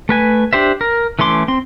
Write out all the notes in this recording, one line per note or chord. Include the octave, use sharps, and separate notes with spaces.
A3 B4 G#5
D4 G4 C5 E5
A#4
E3 A3 C#4 C6 D6
C4 C6